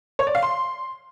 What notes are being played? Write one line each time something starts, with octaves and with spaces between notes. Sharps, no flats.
C#5
D5
F5
C6